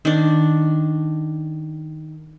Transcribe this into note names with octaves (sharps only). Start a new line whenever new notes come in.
D#3 D4